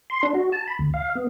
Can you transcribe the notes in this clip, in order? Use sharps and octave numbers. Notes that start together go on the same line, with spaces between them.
C6
D4
F#4
A5
B5
D2
F5
B3